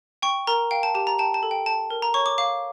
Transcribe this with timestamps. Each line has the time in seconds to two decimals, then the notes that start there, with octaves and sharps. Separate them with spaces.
0.22 G5 C#6
0.47 A#4 A#5
0.71 F5 G5
0.83 A5
0.95 G4 A5
1.07 A#5
1.19 G5 A5
1.34 A5
1.43 A4
1.51 G5
1.66 G5 A5
1.90 A#4
2.02 A#5
2.14 C#5 C#6
2.26 D6
2.38 F5 D6